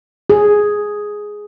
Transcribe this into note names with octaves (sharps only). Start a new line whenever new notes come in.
G#4